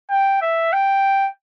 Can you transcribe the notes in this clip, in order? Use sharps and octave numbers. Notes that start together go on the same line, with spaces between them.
G5
E5
G5